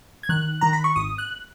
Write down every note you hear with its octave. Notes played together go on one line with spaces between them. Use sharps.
G#6
D#3 F#6
D#3 A#5
B5
C#6
G#1 D#6
F#6